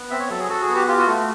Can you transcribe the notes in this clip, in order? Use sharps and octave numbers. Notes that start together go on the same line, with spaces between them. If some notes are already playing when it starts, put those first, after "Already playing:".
Already playing: B3
C4 E5
C#5
F#3 A4
G#4
F#4 A4
G#4
B3
G4
F4 G4
F#4
A3